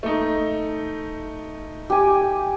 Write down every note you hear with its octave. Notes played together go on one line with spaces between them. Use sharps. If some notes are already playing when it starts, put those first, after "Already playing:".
A3 D#4
G4 G#5